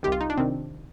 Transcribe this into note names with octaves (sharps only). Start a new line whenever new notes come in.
C2 C3 D#3 G4
F4
D#4
D4
C3 D#3 C4